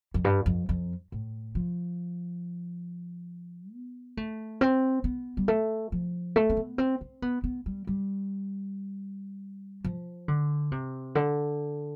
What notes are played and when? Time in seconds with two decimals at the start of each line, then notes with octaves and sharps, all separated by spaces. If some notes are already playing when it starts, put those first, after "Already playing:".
0.14 F2
0.24 G2
0.46 F2
0.69 F2
1.12 A2
1.55 F3
3.73 B3
4.17 A3
4.61 C4
5.04 B3
5.37 G3
5.48 A3
5.92 F3
6.36 A3
6.49 C4
6.57 B3
6.78 C4
7.01 C4
7.22 B3
7.44 B3
7.66 G3
7.87 G3
9.84 F3
10.28 D3
10.72 C3
11.15 D3